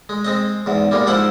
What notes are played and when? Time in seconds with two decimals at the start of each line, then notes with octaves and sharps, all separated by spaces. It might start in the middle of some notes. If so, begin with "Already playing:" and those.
0.09 G#3
0.25 G#3 C4 D#5
0.66 E2 G#2
0.91 G3 G#3 A#3
1.07 G#2 F3 E4 C5 F#5 B5